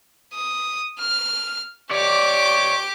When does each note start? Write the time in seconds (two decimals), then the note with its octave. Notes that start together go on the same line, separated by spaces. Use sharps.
0.34 D#6
1.00 F6
1.91 G4 C#5 D5 D6